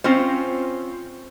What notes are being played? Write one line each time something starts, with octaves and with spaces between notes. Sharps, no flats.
C4 C#4 F4 C5